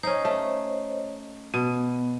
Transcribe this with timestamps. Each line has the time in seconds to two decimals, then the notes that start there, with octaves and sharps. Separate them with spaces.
0.03 C#4 D#4 C5 C#5 D#5
0.25 A3
1.54 B2 B3